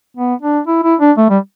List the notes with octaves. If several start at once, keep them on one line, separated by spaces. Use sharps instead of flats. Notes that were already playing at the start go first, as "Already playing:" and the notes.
B3
D4
E4
E4
D4
A3
G3